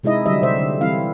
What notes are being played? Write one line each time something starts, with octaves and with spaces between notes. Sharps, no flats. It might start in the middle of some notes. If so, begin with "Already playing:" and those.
C3 G#3 D#4 E4 D#5
D3 F#3 G3 D#5 E5
C3 C5 E5
D3
E3 G3 C4 E4 F5